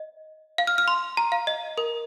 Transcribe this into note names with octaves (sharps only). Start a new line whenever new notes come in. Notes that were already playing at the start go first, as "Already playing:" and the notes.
Already playing: D#5
F5
F6
F6
C6
A#5
F5
D#5
A#4